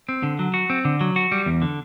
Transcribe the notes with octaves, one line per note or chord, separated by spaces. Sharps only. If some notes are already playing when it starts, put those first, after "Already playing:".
C4
D3
F#3
F#4
C4
D3
F#3
F#4
G3
E2
D3